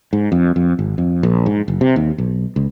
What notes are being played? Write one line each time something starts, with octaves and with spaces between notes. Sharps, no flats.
G#2
F2
F2
G#1
F2
A#1
G#2
F#1
C3
D#2
B1
C#2